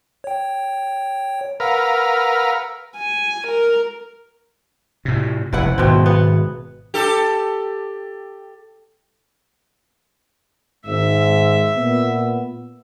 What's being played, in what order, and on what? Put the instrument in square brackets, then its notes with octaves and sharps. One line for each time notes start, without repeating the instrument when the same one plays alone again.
[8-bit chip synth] C#5 G5
[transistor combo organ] A#4 B4 F5 [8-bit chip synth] F#5 E6 F6
[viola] G#5
A#4
[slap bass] A2 C3
[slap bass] F1 [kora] E4 B4 F#5
[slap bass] G#1 [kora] B2 C4
[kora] B3
[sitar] G4 A4
[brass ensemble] G#1 G#2 [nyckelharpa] E5
[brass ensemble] A#2 B3